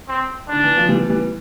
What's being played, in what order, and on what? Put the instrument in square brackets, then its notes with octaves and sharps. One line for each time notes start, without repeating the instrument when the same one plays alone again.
[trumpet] C4
[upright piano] D3 [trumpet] D4
[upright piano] E3
F3
E3 G3
E3 G3